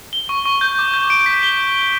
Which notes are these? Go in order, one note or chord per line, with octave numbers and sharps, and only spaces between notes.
G7
C#6
C#6
G6
D6
G6
D7
B6
G7